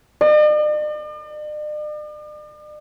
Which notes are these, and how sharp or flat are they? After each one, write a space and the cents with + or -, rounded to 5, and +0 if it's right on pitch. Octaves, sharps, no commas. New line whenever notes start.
D5 +45